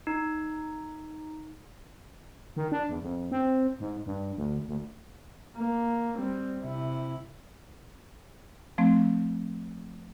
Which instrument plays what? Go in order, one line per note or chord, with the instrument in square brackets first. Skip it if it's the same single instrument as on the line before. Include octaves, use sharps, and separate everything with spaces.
[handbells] D#4
[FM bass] D#3
D4
E2
F2
C4
G#2
G2
D2
D2
[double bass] A#3
G3 C4
C3 E4
[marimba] F3 A3 C4